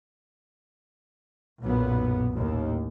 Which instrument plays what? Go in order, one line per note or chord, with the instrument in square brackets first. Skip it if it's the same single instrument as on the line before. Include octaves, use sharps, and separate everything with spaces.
[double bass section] B1 F#2 A#2 B3
A1 D#2